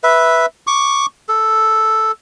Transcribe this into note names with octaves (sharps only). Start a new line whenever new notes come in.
B4 E5
C#6 D6
A4